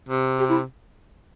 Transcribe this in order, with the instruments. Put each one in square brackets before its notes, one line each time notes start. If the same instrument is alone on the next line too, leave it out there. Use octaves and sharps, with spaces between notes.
[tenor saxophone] C3
[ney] G4
E4